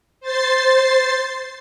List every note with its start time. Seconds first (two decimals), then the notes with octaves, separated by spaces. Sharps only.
0.20 C5 A6 C7